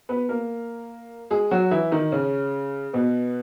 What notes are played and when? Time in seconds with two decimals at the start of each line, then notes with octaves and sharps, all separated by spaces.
0.09 B3 B4
0.29 A#3 A#4
1.30 G#3 G#4
1.51 F#3 F#4
1.71 E3 E4
1.92 D#3 D#4
2.12 C#3 C#4
2.93 B2 B3